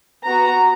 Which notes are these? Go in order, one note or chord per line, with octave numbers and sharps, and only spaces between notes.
B3 F#4 A#5